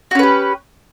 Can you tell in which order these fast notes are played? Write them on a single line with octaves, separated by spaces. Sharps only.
F#4 C#4 B4 G4